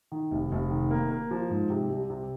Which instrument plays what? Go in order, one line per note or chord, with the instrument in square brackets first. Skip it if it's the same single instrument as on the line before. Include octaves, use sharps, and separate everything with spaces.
[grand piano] D#3
F1
F1
D#3
A#3
A#3
F3
G#2
C3
C2
C3